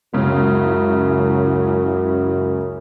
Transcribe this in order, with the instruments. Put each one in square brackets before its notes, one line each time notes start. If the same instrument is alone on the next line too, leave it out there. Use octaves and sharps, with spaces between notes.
[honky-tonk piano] C#2 C#3 [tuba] F#2 [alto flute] E4